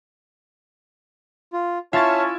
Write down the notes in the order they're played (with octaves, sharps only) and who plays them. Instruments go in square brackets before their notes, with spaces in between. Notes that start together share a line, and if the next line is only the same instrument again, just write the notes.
[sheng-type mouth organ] F4
[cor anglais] C#4 [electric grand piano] E4 E5 [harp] F4 A6 [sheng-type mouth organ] C#5 A5